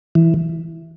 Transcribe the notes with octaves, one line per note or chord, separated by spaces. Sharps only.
E3